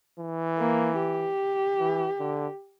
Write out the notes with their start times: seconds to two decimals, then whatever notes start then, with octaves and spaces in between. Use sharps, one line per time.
0.18 E3
0.59 A#3
0.99 G4
1.79 E3
2.19 D3